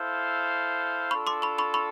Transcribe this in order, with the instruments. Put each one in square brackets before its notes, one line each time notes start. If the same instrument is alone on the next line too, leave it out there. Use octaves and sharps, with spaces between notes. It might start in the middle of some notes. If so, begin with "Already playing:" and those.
Already playing: [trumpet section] E4 A4 C5 F5
[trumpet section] D4 F4 A4 [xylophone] B5 C#6
[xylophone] C6 D6
B5 C#6
B5 C#6
B5 C#6